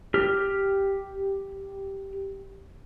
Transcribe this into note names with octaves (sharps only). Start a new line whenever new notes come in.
G4 F6